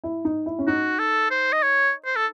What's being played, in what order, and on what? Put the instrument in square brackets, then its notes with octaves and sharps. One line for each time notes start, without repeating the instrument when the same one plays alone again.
[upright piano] E4
D#4
E4
C#4
[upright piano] D#4 [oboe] F#4
[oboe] A4
C5
D#5
C#5
C5
A4